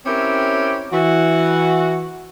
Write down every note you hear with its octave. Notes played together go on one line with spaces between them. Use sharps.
C4 C#4 E4 G4 A#4 C#5
E3 F#4